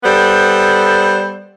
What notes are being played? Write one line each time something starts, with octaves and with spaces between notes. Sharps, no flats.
G3 B3 A4 C5